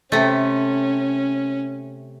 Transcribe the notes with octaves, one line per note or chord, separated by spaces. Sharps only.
C3 A3 C#4